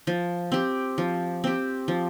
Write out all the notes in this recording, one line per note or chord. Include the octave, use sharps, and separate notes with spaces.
F3
C4 G4
F3
C4 G4
F3